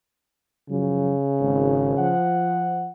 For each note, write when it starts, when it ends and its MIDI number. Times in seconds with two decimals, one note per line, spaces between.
0.70 1.13 42
0.70 2.13 49
0.70 1.13 53
0.70 1.13 54
1.41 1.97 32
1.97 2.90 53
1.97 2.90 78